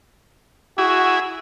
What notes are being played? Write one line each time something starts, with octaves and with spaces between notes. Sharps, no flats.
E4 F#4 G#4